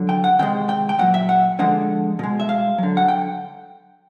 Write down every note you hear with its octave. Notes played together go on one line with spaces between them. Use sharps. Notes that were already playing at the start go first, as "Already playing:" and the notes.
Already playing: D3 F#3
G5
F#5
C3 D#3 G#3 G5
G5
G5
A#2 F#3 F#5
E5
F#5
D3 F3 G#3 F#5
B2 G#3
E5
F5
D3 F#3
F#5
G5